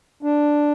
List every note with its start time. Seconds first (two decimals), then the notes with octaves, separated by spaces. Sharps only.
0.23 D4